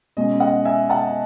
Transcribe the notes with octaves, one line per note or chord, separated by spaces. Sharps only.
B2 G#3 C#4 D#5
D#5 F#5
E5 G#5
F#5 A5